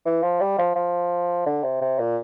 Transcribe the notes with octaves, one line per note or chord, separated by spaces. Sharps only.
E3
F3
G3
F3
F3
D3
C3
C3
A#2